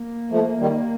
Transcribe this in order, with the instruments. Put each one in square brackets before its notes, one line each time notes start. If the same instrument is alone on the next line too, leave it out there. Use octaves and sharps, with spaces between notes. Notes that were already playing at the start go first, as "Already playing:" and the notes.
Already playing: [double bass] A#3
[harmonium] F3 A3
D#3 G3